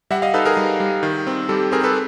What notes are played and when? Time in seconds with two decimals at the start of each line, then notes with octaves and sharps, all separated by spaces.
0.11 G3 E5 F#5
0.22 D#5 F5
0.34 D#4 A4 B4
0.46 G#4 A#4
0.57 G3
0.80 G3
1.03 D#3
1.27 C4
1.49 G3 G4 A4
1.72 C4 G#4 A#4
1.83 A4 B4